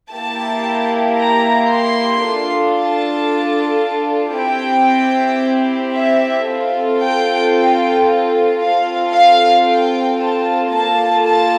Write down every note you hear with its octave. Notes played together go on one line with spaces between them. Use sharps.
A#3 E4 G4 A5
A#5
C6
D4 F4 A4
A5
C4 E4 G4 G5
E5
C4 F4 A4
G5
G5
C4 F4 A4 F5
F5
G5
A5
A#3 F4 A4 A5
A5